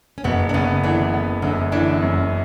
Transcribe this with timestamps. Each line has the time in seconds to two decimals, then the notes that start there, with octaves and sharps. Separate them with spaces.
0.18 C#4
0.24 F#1 B2 B3
0.49 D4
0.54 C#3 B3 C#4
0.84 D3 E3 D4
1.14 B3
1.42 F#2 D3 D4
1.72 D3 E3 D4
2.02 F#2